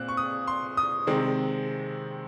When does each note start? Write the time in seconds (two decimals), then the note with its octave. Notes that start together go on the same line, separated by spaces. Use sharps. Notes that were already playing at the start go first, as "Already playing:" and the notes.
Already playing: A#2 C4 F#6
0.08 C#6
0.17 D#6
0.47 C6
0.77 D#6
1.07 C3 D#3 G#3 C4